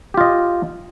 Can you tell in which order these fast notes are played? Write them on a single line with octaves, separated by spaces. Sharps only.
G4 F4 D#5